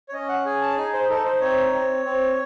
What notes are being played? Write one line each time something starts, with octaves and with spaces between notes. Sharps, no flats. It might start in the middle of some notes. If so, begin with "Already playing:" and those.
C#5
C#4 D#5
F#5
G#4 G#5
A5
D#4 G#5
C5
D#4 A4
C5
C4 C#5
C4
C4